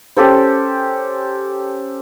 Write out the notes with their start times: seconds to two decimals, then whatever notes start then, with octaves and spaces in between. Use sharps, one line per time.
0.17 C#4 G4 A4 C5